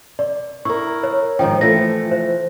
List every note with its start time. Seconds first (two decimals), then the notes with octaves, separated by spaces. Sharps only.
0.19 D5
0.65 E4 A#4 C#6
1.03 C#5
1.39 G#2 D#3 F3 G5
1.61 E3 F3 A3 A#6
2.11 C5